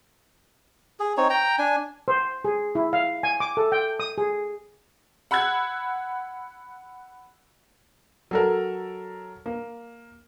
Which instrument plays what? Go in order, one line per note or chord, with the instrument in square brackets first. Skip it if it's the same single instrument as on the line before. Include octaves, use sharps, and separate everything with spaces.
[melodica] G#4
C4 D#4 C#5
G5 A#5
D4 G#5
[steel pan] C5
G#4
E4
F5
G#5
D6
A4
G5
D#6
G#4
[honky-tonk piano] F#5 B5 E6 F#6 G#6
[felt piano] F#3 A4 A#4
A#3